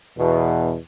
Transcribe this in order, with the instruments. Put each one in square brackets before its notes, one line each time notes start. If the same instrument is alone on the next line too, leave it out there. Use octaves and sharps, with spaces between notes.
[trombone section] E2 B2